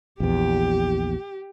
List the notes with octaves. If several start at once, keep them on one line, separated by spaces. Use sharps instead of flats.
A#1 E2 G4